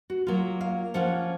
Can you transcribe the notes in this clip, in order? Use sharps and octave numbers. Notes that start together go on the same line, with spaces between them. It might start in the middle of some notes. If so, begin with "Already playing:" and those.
F#4
F#3 A#3 F4
F5
F3 A#3 C#4 F4 F#5